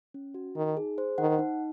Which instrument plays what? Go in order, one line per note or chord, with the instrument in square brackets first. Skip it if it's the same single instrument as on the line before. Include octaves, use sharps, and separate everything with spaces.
[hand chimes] C#4
F#4
[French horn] D#3 [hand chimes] D#4
[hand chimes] G#4
C5
[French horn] D#3 [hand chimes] F#5
[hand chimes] D#4